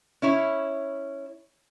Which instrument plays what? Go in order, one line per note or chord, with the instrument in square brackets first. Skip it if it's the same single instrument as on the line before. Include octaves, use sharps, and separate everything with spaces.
[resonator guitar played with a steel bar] C#4 E4 C#5